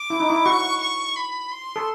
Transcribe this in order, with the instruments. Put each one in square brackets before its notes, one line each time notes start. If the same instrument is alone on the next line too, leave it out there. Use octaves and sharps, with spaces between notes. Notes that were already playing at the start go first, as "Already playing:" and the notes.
Already playing: [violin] D6
[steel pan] E4
D#4
E4
[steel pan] F#4 [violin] C#6
[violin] C#6
B5
C6
[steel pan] A4